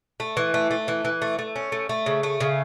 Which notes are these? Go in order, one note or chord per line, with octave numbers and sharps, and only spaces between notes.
A3
E3
A3
A3
E3
E3
A3
A3
C#4
A3
A3
C#3
A3
C#3